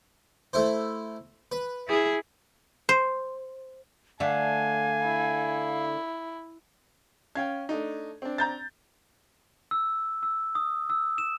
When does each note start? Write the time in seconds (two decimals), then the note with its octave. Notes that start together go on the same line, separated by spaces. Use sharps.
0.53 A3 E4 C5
1.52 B4
1.88 E4 G#4
2.89 C5
4.20 D3 A3 F5 G#5
5.03 E4
7.35 C#4 F5 G5 G#6
7.69 A3 D4 D#4
8.22 C4 D4
8.38 A#5 G6 A6
9.71 E6
10.23 E6
10.55 D#6
10.90 E6
11.18 E7